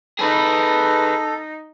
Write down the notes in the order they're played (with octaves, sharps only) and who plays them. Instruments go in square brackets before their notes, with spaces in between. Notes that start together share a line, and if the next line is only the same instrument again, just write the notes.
[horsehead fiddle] D#4 [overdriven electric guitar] G#4 B4 [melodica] A4